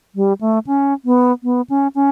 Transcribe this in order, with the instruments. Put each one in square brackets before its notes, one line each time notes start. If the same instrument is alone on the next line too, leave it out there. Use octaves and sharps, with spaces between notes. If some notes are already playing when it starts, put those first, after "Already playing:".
[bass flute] G3
A3
C#4
B3
B3
C#4
C#4